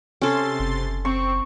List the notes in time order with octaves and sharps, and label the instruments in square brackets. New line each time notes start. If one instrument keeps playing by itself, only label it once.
[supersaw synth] C3 C6 A6 [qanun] C#4 A4
[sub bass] F#1
[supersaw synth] C4 [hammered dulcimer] C#6